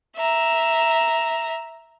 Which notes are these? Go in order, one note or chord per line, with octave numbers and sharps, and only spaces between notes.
E5 A#5